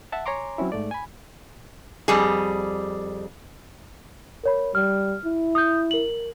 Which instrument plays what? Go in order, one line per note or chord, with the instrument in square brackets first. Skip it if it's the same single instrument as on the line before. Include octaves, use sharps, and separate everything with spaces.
[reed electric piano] E5 F#5 A5
C#5 G#5 A#5 C6 D6
F#3 C4 C#4 E4
G#2 A3 D5
G#5 B5
[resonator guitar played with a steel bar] F2 G3 G#4
[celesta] A#4 C#5 B5
[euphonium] G3 [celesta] F6
[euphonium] E4
[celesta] D#6 G6
A#4 F#7